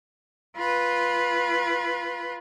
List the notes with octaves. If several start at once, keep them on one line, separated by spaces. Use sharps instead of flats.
F4 B4